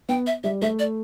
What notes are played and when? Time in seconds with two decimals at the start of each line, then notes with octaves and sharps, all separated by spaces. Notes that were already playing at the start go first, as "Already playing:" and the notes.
0.09 B3 G5
0.27 E5
0.44 G3 E5
0.62 A3 E5
0.79 D5